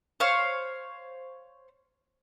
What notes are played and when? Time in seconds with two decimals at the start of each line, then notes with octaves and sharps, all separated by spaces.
0.20 C5 C#5 F5 C#6